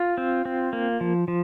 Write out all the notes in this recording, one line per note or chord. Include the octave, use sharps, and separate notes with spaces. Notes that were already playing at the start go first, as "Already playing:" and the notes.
Already playing: F4
C4
C4
A#3
F3
F3